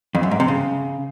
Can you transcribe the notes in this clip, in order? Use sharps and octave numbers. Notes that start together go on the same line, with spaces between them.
F2
F#2
G#2
C3
C#3